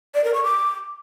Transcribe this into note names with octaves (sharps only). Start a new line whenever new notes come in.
D5
A#4
C#6
D6